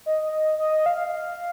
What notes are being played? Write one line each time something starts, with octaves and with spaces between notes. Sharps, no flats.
D#5
D#5
D#5
F5